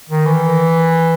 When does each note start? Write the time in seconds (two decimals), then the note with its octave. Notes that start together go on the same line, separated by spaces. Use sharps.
0.09 D#3
0.26 E3